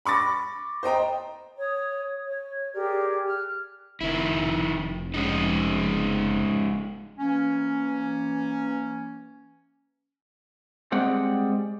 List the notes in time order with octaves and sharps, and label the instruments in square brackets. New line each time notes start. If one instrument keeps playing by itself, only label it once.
[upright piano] B5 C#6 D6 A6 A#6
C5 D#5 G5 A#5
[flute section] C#5 D#6
C#5
G4 G#4 A#4 D5
F6 F#6
[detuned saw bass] F1 [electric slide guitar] D#3 E4
[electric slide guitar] G#3 C#4 D#4
[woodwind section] E3 A#3 C#4
[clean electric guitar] G3 G#3 C4 F#5